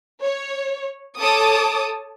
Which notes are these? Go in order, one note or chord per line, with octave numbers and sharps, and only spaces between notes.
C#5
A4 C#5 A5 D6 D#6